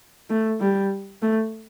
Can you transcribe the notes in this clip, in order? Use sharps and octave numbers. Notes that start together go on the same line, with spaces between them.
A3
G3
A3